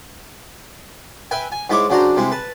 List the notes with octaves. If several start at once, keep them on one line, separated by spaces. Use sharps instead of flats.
B4 E5 G5 G#5
G#5
G#2 G#3 E4 C#5 D6
C#3 F#3 D4 C5 A#5
C3 G#3 E4
B4 A5